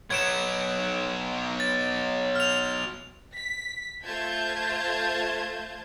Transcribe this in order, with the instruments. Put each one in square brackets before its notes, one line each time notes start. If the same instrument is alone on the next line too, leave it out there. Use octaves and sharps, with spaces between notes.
[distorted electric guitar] F#3 B3 [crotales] G#6 D7 E7
[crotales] A6
F6 F7
[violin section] B6
A3 F4 C5 A5 G6 G#6